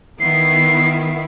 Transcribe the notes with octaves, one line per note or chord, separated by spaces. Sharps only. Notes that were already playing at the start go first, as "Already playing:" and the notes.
D#3 B3 E4 C7